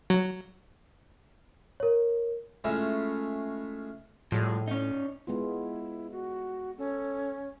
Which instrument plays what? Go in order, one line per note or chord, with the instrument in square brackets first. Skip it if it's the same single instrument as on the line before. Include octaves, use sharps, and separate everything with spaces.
[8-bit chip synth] F#3
[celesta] A#4 C#5
[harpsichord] G#3 A3 C#4 E4 F4 E5
[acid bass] A2 [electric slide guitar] F3 G3 G#3
[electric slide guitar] C#4 D#4
[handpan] G#3 B3 F4 [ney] E4
[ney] F#4
[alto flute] C#4 [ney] A4